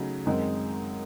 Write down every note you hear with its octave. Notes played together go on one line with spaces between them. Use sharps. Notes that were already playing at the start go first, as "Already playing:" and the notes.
Already playing: C#3 F#3 A3 D#4
F#2 D#3 G#3 C4 D#4